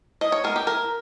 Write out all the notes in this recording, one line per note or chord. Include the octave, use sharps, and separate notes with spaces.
E3 D#5
C#5
G#3 B3 A#4
G4
E3 A#4